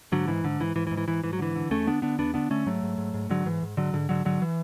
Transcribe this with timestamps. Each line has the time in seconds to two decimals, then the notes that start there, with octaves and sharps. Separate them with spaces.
0.12 G#2 D3 F#3
0.28 G#2 E3
0.44 G#2 D3
0.60 G#2 E3
0.75 G#2 E3
0.87 E3
0.91 G#2
0.97 E3
1.08 G#2 E3
1.24 G#2 E3
1.33 F#3
1.39 D3 E3
1.56 D3
1.70 E2 A3 C#4
1.87 D3 B3 D4
2.02 D3 B3 D4
2.19 E2 B3 D4
2.34 D3 B3 D4
2.50 D3 A3 C#4
2.66 G#2 F#3 A3
2.83 G#2
2.98 G#2
3.14 G#2
3.30 G#2 D3 F#3
3.45 G#2 E3
3.62 G#2
3.77 G#2 D3 F#3
3.93 G#2 D3
4.09 G#2 D3 F#3
4.25 G#2 D3 F#3
4.42 E3